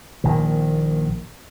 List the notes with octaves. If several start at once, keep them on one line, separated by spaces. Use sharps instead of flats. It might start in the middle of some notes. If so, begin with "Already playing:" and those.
A#1 A#2 D#3